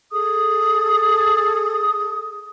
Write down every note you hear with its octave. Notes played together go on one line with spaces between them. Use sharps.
G#4 A4 D#6